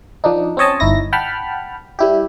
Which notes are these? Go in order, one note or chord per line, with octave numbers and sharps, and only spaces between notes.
F3 D4 D#4
C4 C#4 C#5 D#5 A5
G1 D#4 E4 A#6
F#5 G5 A5 B5 F6
G3 E4 G4